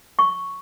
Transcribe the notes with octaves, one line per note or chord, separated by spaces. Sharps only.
C#6